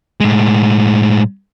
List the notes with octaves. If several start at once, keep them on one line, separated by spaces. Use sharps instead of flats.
A2 G#3